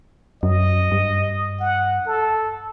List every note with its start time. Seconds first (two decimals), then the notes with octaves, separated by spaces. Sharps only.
0.43 F#2 D#5
0.92 G2
1.60 F#5
2.07 A4